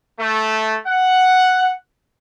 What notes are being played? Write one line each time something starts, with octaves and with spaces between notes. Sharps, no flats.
A3
F#5